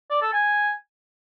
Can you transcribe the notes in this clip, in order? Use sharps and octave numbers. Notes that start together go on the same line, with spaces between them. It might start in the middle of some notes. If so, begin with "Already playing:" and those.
D5
A4
G#5